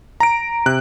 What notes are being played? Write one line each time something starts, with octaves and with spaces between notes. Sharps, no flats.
A#5 D7
C3 F#6